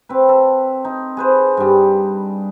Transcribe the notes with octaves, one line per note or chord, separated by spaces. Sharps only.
C4 B4
A4
D#4
G#4 B4 C5
G2 G3